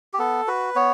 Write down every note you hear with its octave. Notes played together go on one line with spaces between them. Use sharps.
G4
B3 A4
F#4 B4
B3 C#5